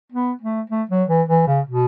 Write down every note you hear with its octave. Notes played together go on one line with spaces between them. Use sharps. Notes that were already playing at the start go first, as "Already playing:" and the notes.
B3
A3
A3
F#3
E3
E3
C#3
B2